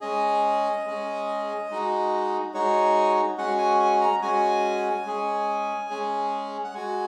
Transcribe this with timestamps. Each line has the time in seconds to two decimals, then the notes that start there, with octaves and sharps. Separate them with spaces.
0.01 G#3 C#4 G#4 D#5
0.86 G#3 C#4 G#4
1.70 G#3 D#4 F#4
2.54 G#3 D#4 F#4 C#5
3.38 G#3 C#4 F#4 F#5
3.58 G#5
3.80 G#5
4.01 A#5
4.22 G#3 C#4 F#4 G#5
5.05 G#3 C#4 G#4
5.90 G#3 C#4 G#4
6.64 F#5
6.74 G#3 F#4 G#5